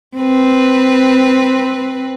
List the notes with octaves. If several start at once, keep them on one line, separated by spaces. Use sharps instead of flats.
C4 B4